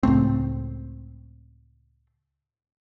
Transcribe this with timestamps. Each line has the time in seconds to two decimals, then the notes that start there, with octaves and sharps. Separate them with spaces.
0.03 C#2 A2 A3 C4